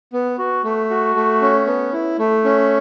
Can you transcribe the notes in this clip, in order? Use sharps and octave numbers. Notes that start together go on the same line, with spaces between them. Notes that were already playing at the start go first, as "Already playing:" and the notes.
B3
F#4
A3
F#4
A3
C#4
B3
E4
A3
C#4